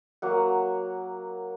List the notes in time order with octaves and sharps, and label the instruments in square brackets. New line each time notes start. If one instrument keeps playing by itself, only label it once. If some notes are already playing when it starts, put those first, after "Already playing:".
[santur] F#3 A#3 F#5